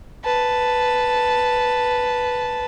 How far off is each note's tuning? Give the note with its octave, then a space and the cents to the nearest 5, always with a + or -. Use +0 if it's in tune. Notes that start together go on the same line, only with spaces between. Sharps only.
B4 +0 A5 +0